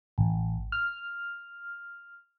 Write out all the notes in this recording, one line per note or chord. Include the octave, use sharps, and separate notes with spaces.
A1
F6